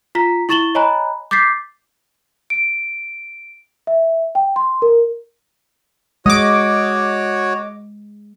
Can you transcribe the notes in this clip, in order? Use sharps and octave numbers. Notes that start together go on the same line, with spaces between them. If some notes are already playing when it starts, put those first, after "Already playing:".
F4 A#5 B6
E4 C#6 A6 E7 F#7 G7
C#5 D#5 G#5 A#5 B5 F#6
D6 G6 A6 B6 C7
D7
E5
G5
C6
A#4
G#3 F#4 C#5 D#5 D6